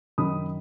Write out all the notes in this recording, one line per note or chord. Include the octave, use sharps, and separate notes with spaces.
F#2 D#3 B5 D#6